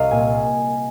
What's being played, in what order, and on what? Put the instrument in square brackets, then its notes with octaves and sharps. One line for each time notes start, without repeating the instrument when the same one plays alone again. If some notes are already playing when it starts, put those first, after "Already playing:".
Already playing: [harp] C2 D#5 F5
A#2 G#5